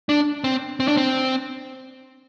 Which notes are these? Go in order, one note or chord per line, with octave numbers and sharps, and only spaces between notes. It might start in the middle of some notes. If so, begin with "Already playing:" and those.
D4
C4
C4
D4
C4